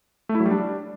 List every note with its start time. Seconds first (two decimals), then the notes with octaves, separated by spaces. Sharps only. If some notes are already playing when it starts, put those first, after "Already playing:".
0.29 A3
0.35 E4
0.40 F#3
0.46 G3
0.51 D4